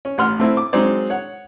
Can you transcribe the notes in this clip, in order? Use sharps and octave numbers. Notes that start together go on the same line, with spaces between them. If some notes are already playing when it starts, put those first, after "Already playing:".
C#4
A1 F#5 C6 F6
A3 C4 E4
D6
F#3 G#3 C4 D#4 C5 D5
C#5 F#5